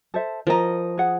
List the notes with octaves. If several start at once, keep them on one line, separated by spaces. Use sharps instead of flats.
A4 C5 E5
F3 A#4 D#5 A#5
G#4 F#5